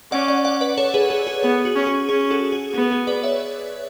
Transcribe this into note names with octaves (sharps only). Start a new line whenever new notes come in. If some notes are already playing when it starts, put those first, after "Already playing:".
C#4 D5 F#5
D5 F#5
D5 F#5
B4 D5
A4 C#5
G#4 B4
G#4
G#4
B3 G#4
F#4
C#4
G#4
C#4 G#4
F#4 A4
G#4
B3 G#4
G#4
B4 D5
C#5 E5